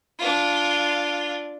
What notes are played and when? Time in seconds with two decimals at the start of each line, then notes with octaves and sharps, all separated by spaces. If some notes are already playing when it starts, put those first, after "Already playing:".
0.19 D4 F4